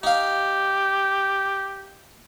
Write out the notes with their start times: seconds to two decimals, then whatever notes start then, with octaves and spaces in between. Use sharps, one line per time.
0.03 D#4 G4 F5